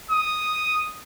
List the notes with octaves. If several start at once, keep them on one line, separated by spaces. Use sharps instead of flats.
D#6